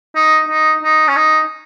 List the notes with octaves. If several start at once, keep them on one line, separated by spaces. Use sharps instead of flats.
D#4
D#4
D#4
C#4
D#4